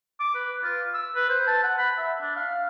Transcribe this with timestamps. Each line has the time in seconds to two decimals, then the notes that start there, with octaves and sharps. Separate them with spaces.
0.20 D6
0.35 B4
0.64 F4
0.94 E6
1.15 B4
1.29 C5
1.47 A5
1.63 F#5
1.78 B5
1.98 E5
2.21 D4
2.36 F5